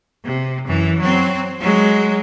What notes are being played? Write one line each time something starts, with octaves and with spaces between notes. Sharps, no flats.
C3
F#2 E3
F#3 C4
F#3 G#3